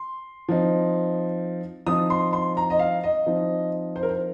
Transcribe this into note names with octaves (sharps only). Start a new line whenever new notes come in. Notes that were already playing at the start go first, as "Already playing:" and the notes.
Already playing: C6
F3 C4 D#4
F3 C4 D#4 D#6
C6
C6
A#5
D#5
F5
D#5
F3 C4 D#4
C5
A#4
C5